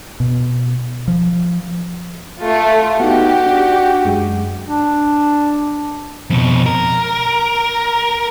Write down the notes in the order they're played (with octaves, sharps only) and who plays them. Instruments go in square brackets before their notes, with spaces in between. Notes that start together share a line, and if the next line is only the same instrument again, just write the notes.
[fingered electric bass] B2
F3
[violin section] A3 F4
[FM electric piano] B3 D#4 [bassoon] F#4 [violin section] G4
[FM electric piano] D4
F#2 G#3
[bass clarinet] D4
[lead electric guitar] F2 B2
A#4